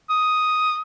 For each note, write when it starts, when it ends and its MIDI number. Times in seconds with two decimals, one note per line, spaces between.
0.09 0.81 87